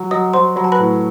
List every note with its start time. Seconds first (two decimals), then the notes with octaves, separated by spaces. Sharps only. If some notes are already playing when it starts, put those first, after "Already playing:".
Already playing: F#3
0.11 F#3 D#5 D#6
0.33 F#3 C5 C6
0.56 F#3 B5
0.64 A5
0.72 B4 B5
0.79 A2